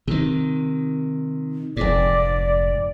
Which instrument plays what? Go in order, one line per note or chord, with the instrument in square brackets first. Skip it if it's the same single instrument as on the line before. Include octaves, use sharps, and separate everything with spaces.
[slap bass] C3 D#3
[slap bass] F1 G#2 [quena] D5